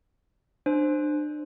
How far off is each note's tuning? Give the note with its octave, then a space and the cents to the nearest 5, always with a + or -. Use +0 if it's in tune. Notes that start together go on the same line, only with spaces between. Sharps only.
D4 +30 C5 +0